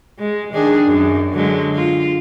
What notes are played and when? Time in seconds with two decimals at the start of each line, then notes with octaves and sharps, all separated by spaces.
0.19 G#3
0.54 D#3 D4 G#4
0.86 F#2
1.33 D3 F#3 G#3
1.75 F4